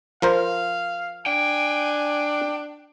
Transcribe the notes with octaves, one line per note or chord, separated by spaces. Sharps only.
F3 A#4 C5 F5
D4 G5 G#5